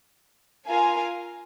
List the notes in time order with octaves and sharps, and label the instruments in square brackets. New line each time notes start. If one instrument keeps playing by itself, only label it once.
[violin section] F4 A#4 F5 G#5